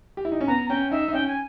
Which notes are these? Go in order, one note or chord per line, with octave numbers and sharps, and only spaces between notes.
G4
E4
D#4
C#4
B3 A#5
C#4 G5
D#4 E5
D#4
C#4 G5
G#5